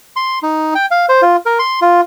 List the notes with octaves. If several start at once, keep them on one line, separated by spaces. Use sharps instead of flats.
C6
D#4
G5
F5
C5
F4
A#4
C6
F4